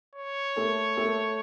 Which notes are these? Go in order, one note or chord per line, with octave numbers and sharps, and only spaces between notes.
C#5
A3 A4
A3 A4